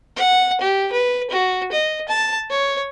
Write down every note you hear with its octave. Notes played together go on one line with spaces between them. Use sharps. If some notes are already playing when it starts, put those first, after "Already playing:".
F#5
G4
B4
F#4
D#5
A5
C#5